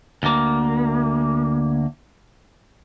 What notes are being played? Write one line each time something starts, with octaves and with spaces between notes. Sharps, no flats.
D2 A#3